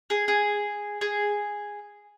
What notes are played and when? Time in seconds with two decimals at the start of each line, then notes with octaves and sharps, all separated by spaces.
0.10 G#4
0.28 G#4
1.01 G#4